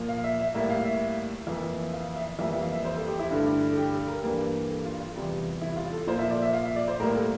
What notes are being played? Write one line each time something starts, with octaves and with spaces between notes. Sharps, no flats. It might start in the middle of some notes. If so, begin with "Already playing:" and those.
Already playing: A#2 F3 A#3
F5
E5
E5
A2 G3 A#3 E5
F5
E5
F2 E3 A#3
F5
F5
E5
E5
F2 E3 G3 A#3 E5
E5
F5
E5
C5
A4
G4
E4
G2 D3 A3
A4
G4
A4
A#4
G2 E3 G3 A#3
A4
F4
F4
E2 C3 G3
E4
F4
A4
A#2 F3 A#3 C5
E5
D5
E5
F5
E5
D5
C5
A2 G3 A#3 A#4
A4